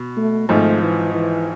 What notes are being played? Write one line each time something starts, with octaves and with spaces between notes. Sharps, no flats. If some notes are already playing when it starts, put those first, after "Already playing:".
Already playing: B2
A3
G#1 G#2 F3 A3
E3
E3